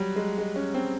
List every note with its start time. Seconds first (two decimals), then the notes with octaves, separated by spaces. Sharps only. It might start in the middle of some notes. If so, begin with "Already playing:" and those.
Already playing: F#3 G3
0.16 G#3
0.38 G#3
0.56 C#4
0.74 C4